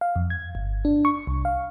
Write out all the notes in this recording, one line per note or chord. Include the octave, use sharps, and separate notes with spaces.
F5
F2
G#6
G1
D4
C#6
C2
F5